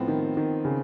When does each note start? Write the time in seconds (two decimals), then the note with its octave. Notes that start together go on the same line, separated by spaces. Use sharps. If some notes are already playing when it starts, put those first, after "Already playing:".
Already playing: A2 F3 B3 C4
0.08 D#3
0.37 D#3
0.65 C#3